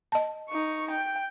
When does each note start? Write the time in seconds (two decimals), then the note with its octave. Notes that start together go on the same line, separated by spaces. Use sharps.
0.12 D#5 A5
0.50 D#4 C#6
0.91 G5